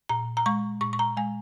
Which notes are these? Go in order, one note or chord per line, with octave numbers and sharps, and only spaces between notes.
A#2 A#5
A#5
G#3 C#6
A#2 C#6
C#6
A#5
G#3 G#5